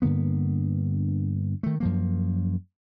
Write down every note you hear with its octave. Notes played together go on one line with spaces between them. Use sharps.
G2 D3 A#3 B3
D#3 A3
F#2 F3 A#3